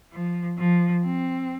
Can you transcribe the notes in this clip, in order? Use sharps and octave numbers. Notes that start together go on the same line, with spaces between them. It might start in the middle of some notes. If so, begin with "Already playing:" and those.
F3
F3
C4